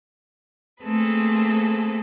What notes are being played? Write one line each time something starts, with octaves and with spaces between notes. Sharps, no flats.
A3 A#3 C4 G#4 A4 B4